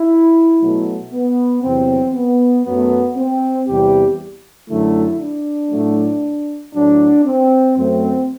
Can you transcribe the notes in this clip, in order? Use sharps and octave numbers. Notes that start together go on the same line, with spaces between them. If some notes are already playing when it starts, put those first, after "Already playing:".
Already playing: E4
B2 F#3 A3
B3
E2 C3 F#3 C4
B3
F#2 F#3 A3 B3
C4
E2 C3 G3 G4
F#2 D3 F#3 A3 E4
D4
A2 F#3 A3
A2 F#3 A3 D4
C4
F#2 F#3 A3 C4